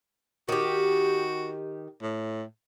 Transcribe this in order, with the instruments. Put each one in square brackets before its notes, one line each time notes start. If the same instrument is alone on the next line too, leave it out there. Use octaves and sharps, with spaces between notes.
[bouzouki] D#3 G4 [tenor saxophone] F#4
[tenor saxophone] A2